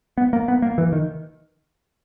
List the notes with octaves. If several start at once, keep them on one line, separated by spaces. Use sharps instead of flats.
B3
A#3
B3
A#3
E3
D#3